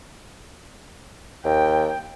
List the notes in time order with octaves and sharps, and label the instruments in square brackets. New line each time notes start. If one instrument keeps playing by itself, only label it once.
[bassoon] D#2 [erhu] G5